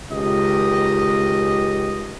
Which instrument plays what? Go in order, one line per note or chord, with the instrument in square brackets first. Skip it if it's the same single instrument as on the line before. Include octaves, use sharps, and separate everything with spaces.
[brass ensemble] C#2 D#3 G4 D#5